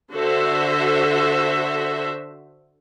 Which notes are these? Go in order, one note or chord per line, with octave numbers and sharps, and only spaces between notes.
D3 F#4 A4 C5 E5